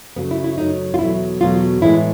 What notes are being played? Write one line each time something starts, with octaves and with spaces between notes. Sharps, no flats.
F#2 C#3 F#3 A3 B3
E4
E4
F#2 C#3 F#3 A3 D#4
F4
E2 B2 F#3 A3 E4
E2 B2 F#3 A3 F4
A2 E3 G#3 E4